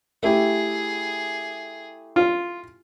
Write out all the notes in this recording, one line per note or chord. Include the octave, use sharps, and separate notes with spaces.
A3 E4 G4 G#4
F4